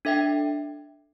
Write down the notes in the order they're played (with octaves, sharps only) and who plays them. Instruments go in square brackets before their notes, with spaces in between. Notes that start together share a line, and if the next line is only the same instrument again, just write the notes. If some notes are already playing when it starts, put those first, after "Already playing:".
[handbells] D4 A4 E5 G5